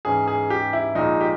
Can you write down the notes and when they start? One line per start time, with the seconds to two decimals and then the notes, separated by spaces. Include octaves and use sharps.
0.05 G#2 E3 G#3 C#4 G#4
0.28 G#4
0.50 G4
0.73 E4
0.95 A#1 A#2 G#3 D#4
1.21 G4